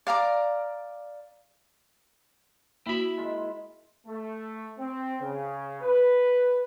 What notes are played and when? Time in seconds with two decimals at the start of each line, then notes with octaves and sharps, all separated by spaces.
0.07 D5 F5 A#5 D6
2.87 A#3 E4 F#4 B5
3.18 G#3 F4 A#4
4.07 A3
4.79 C4
5.21 C#3
5.81 B4